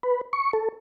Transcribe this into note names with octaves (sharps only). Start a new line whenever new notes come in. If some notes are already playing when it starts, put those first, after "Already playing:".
B4
C#6
A4